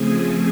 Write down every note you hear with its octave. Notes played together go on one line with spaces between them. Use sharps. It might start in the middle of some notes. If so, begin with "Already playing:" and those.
Already playing: C#3 F3 A3 C4 G#4 G#5